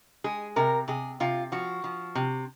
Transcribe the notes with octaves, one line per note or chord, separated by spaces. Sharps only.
G#3 G#4
C3 A#4
C3 G#4
C3 F4
F3 F#4
F3
C3